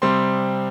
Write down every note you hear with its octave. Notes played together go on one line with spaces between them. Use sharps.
C3 G3 C4 C6